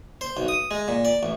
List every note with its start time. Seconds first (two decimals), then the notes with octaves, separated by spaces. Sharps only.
0.21 C5
0.37 B1
0.48 D#6
0.71 G#3
0.88 A#2
1.05 D5
1.23 A1